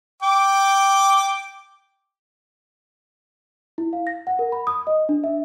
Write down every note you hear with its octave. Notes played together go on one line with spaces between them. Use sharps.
G5 D6
E4
F5
A#6
F#5
A#4
B5
D#6
D#5
D4
E5